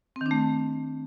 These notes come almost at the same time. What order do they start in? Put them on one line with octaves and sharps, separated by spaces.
C4 D#3 D4 A3